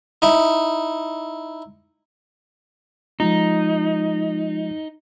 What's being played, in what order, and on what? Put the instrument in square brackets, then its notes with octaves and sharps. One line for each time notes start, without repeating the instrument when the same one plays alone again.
[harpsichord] D#4 E4
[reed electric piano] F3 G#3 F4 [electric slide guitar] D#4